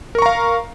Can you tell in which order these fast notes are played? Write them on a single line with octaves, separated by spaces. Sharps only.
A#4 C#6 A#5 F5